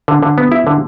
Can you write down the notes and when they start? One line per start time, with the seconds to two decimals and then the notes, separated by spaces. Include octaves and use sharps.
0.08 D3
0.23 D3
0.38 B3
0.52 E4
0.67 D3